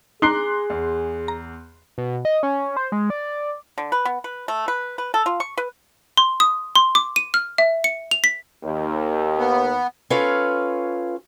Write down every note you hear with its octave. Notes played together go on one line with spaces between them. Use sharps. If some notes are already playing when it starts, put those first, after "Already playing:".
D#4 G#4 A#5 C6 D6 F#6 C7 G7
E2
A#5
B2
D#5
C#4
C5
G#3
D5
D3
B4
B3
B4
A3
B4
B4
A4
F4
C#6
B4
C6
D#6
C6
D6
D#7
F6
E5
C#7
F7
B6
D#2
B3
C#4 F4 A4 B4 C#5 F5